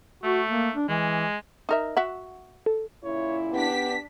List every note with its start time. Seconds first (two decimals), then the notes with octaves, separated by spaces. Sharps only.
0.24 A3 F#4
0.50 A#3
0.75 D4
0.89 E3 G#3
1.69 D#4 A#4 E5
1.97 F#4 E5 F#5
2.66 A4
3.04 A#2 C#3 E4 C#5
3.52 B3 D4 G4 B6